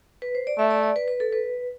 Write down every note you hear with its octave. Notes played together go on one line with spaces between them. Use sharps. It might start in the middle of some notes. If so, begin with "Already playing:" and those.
B4
C5
D5
A3 E5
D5
D5
B4
B4
A4
B4